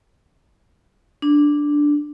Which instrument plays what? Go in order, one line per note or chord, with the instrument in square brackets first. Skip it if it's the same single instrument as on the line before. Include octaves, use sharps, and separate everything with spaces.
[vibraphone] D4